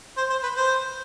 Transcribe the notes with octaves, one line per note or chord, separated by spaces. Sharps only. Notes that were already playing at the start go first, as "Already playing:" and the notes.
C5
C5
B4
C5